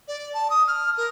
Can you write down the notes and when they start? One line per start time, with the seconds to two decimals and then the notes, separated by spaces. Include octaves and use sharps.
0.08 D5
0.33 A5
0.50 D#6
0.67 F6
0.97 A#4